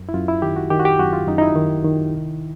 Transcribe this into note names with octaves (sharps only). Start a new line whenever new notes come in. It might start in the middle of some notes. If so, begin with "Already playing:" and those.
Already playing: F#2
E4
F#2 F4
E4
D#3 G4
F#4
D#3 G4
F#4
G4
F#2 F#4
F4
F#2 D#4
D#4
E4
D#3
D#3
C2